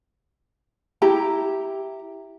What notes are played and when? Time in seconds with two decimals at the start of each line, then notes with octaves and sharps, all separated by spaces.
1.02 E4 G4 A#5